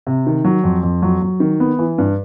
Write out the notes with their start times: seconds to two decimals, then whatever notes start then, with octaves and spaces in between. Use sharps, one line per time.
0.07 C3
0.27 D#3
0.45 F#3
0.64 F2
0.83 F2
1.02 F#3
1.22 F#3
1.40 D#3
1.60 B3
1.79 E3
1.98 G2